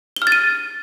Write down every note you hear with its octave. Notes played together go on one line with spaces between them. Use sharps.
G7
F6
A6
D#7